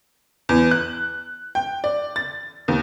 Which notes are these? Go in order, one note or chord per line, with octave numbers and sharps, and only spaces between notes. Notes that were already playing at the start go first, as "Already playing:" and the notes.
E2
F#6
G5
D5
A6
D#2